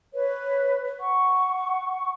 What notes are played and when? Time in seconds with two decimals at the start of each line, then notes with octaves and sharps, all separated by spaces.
0.13 B4 C#5
0.98 F#5 C#6